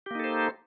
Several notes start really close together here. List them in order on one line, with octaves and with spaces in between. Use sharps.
G4 A#3 D#4 A4 C5